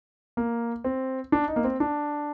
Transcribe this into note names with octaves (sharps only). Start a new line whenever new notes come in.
A#3
C4
D4
D#4
A#3
C4
D4